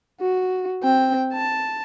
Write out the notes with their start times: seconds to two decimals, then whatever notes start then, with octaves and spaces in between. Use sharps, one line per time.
0.21 F#4
0.83 C4 G5
1.34 A5